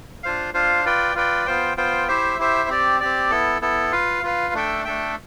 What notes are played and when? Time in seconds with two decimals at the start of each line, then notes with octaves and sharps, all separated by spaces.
0.23 D4 F4 C5 F5
0.54 D4 F4 C5 F5
0.85 F4 B4 D5 G5
1.15 F4 B4 D5 G5
1.46 B3 F4 C5 G5
1.77 B3 F4 C5 G5
2.08 E4 G4 C5 E5
2.39 E4 G4 C5 E5
2.69 C4 G4 D5
3.00 C4 G4 D5
3.31 B3 E4 A4
3.61 B3 E4 A4
3.92 F4 B4 F5
4.23 F4 B4 F5
4.54 A3 D4 A4 E5 G5
4.85 A3 D4 A4 E5 G5